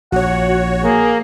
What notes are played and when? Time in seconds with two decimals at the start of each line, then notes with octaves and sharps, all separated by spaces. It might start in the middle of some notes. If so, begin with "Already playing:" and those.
0.12 A#1 F#4 C#5 F#5
0.83 A#3 G#4